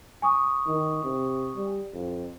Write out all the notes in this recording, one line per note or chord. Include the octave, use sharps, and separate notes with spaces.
G#5 C#6 D#6
D#3
C3
G3
F2